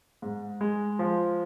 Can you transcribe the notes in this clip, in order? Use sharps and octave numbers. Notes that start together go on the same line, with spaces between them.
G#2
G#3
F3